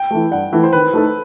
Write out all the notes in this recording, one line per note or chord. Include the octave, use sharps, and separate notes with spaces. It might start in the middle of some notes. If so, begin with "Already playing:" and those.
Already playing: G5
E3 A3
G2 F#5
E3 A3
C5
D#3 B4
A3 D#4 A4